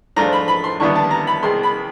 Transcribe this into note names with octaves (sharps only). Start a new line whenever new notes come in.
G#2 F3 A3 D4 F4 A#5
B5
B5
C6
D#2 D3 G3 B3 E4 C#6
A5
A#5
B5
C2 B2 G#3 C6
B5